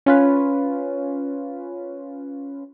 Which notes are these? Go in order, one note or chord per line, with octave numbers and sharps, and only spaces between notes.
C#4 F4 B4